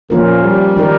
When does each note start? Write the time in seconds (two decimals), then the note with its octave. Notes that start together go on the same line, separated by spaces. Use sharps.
0.10 A#2 F3 A#3 C#4 F4 A#4
0.43 G3
0.76 D#3 G#3 D#4 G4 A#4